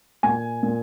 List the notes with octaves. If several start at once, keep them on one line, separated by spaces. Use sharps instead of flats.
A#2 G#5
A#2